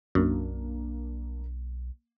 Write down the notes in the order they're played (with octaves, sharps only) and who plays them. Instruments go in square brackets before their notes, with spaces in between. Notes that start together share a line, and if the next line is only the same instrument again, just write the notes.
[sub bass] B1 [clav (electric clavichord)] F#2 [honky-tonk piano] A#3 D4